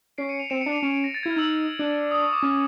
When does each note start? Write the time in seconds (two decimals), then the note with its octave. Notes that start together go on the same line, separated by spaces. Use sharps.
0.18 C#4 C7 D7
0.29 C#7 D#7
0.39 D#7 F7
0.50 C4 D7 E7
0.61 C#7 D#7
0.66 D4
0.72 D#7 F7
0.82 C#4 D7 E7
0.93 D7 E7
1.04 A#6
1.14 A6
1.23 E4 G#6
1.30 F6
1.36 D#4 E6
1.79 D4
2.11 D#6
2.22 C#6
2.33 D6
2.43 C#4